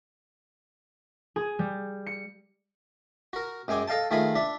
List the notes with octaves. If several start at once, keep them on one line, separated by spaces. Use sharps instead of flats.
G#4
G3
C#7
F#4 A#4
F#2 G#3 G5 G#5 D6 D#6
A4 D#5 F5 G5 A5
D#3 A3 F4 G#4 B5 D#6
D4 E5